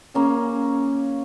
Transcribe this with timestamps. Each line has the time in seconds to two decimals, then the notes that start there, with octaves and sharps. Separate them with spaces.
0.14 A#3 C#4 G#4